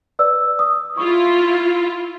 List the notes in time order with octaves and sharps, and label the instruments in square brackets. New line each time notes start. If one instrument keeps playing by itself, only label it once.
[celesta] B4 D5 E6
D#6
[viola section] E4 F4 [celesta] C#6